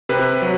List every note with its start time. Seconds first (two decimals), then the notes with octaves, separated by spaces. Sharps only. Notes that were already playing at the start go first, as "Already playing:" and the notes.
0.09 C3 B4
0.42 F#3